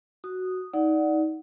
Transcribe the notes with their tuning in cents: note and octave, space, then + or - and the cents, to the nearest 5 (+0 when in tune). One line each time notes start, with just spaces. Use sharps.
F#4 +0 D#6 -10
D#4 +25 D5 +0 F#5 +0